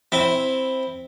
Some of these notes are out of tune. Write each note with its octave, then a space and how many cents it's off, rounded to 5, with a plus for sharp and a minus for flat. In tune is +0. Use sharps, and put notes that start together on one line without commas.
C4 +0 E4 +0